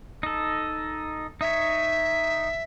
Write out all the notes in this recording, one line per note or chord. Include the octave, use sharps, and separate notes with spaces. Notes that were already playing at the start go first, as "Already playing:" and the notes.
D#4 A4
D#4 C#5 E5